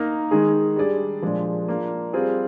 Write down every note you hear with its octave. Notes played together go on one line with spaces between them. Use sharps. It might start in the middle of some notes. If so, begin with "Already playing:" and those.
Already playing: A#3 D#4 A#4
D#3 G#3 D#4 G#4
G3 D4 G#4 D5
A#2 F3 G#3 D4
A#3 D4 F4
G3 C4 F4 G#4